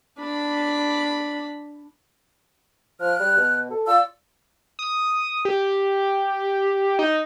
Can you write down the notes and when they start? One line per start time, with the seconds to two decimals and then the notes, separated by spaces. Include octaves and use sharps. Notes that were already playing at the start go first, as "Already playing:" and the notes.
0.19 D4 B5
3.00 F3 F6 F#6
3.20 G3
3.37 B2
3.70 A4
3.87 F4 D5 E6
4.79 D#6
5.45 G4
6.99 D#4